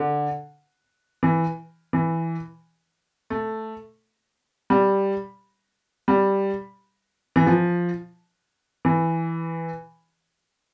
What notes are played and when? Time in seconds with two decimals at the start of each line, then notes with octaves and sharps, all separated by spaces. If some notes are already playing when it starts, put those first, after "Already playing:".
Already playing: D3
1.23 E3
1.93 E3
3.30 A3
4.70 G3
6.08 G3
7.36 E3
7.46 F3
8.85 E3